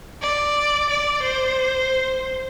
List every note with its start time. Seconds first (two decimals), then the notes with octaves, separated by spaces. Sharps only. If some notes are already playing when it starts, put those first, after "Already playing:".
0.22 D5
0.90 D5
1.23 C5